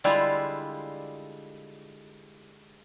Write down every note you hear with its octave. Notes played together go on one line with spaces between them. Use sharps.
D3 G3 G#3 E4 F4